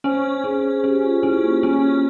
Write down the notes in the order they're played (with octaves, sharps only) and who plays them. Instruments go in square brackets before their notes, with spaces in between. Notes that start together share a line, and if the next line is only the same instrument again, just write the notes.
[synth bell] C#4 [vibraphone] C5
[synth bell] C#4 [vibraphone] G#4
[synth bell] C#4 [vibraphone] G4
[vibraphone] F4
[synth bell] C#4 [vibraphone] E4
[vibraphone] A#3
[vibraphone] A#3 [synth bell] C#4